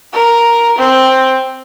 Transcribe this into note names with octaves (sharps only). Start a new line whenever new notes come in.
A#4
C4